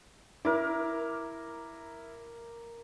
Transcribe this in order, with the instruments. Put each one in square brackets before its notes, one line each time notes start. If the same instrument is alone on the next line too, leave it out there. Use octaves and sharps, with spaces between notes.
[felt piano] E4 [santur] A#4 D6